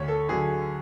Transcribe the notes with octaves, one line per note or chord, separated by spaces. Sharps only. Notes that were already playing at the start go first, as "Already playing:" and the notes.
Already playing: D2 C#5
A4
D3 F#3 G#4